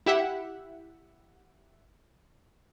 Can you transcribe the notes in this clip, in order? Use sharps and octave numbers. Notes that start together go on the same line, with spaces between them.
E4 G4 E5 F#5